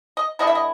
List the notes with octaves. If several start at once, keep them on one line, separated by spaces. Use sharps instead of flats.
D#5
D3 G3 B3 E4 D#5
E5
D#5